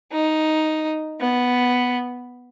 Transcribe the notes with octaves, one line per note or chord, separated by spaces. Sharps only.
D#4
B3